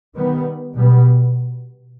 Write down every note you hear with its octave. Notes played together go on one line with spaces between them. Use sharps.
D#3 G3 B3
B2 G3 B3